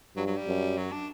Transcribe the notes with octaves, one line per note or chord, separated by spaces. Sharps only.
G2 F#3
F#3
G3
F#2
F#3
D4